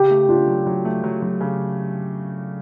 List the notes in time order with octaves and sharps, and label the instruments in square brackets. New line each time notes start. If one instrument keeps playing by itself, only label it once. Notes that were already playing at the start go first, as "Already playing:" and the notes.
Already playing: [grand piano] C#3 [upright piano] G4
[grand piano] A3
[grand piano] D4 [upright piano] F4
[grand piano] F#3
F#3
A3
F#3
F#3
C#3